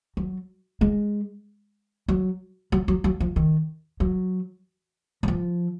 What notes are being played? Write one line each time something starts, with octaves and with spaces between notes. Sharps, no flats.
F#3
G#3
F#3
F#3
F#3
F#3
F3
D#3
F#3
F#3
F3